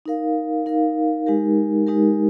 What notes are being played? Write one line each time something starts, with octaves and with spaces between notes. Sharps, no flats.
D#4 A#4 F5
D#4 A#4 F5
G#3 D#4 G4 A#4
G#3 D#4 G4 A#4